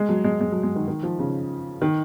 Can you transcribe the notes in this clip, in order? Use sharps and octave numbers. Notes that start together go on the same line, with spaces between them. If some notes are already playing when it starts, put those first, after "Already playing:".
Already playing: G#3
F#3
G#3
G#3
F#3
G#3
D#3
D#3
F3
C#3
D#3